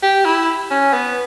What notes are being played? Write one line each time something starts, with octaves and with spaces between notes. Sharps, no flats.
G4
E4
C#4
B3